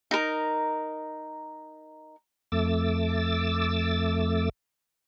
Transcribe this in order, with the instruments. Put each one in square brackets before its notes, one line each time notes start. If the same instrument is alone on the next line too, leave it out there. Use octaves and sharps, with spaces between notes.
[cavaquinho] D#4 A#4
[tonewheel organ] F2 A3 D6 E6 A6